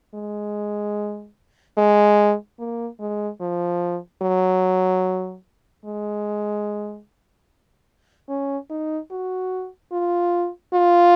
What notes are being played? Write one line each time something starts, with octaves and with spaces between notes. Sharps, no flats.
G#3
G#3
A#3
G#3
F3
F#3
G#3
C#4
D#4
F#4
F4
F4